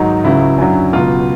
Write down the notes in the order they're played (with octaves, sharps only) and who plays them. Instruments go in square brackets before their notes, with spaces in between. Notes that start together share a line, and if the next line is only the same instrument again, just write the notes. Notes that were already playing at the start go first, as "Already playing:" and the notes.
Already playing: [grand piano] G#2 D#3 F#3 D#4
C#2 C#3 F#3 E4
F#2 D3 F#3
C#2 B2 F#3 F4